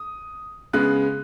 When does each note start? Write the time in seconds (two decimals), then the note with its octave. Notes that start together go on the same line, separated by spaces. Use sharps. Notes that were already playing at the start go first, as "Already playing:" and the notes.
Already playing: D#6
0.73 C#3 G#3 B3 F#6